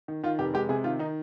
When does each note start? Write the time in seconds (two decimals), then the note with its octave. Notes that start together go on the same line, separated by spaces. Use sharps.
0.08 D#3
0.23 D#3 F4
0.38 F1 G4
0.54 G#3 G4
0.69 C3 G#4
0.84 D#3 F4
0.99 D#3 D#4